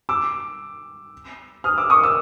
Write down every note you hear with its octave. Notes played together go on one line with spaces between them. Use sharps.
D6 E6
D#6 F6
D6 E6
C#6 D#6
D6 E6